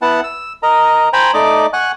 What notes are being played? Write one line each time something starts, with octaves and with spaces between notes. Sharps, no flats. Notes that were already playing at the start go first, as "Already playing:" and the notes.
B3 E4 F#5 A5
E6
A#4 D#5 A#5
C5 G5 G#5 A#5 B5
A3 D#4 D5 D#5 D6
F#5 G#5 C#6 F#6